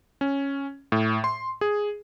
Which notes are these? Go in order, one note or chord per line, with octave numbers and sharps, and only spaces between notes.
C#4
A2
C6
G#4